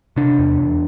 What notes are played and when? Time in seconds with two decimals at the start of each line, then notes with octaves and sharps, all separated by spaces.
0.16 C3 D4
0.39 E2
0.60 E2